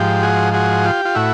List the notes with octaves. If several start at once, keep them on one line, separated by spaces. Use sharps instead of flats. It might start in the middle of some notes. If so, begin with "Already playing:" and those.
Already playing: G#2 F3 G4
F#4 G#4
F#4 G#4
F4 G4
F4
A2 E4 F#4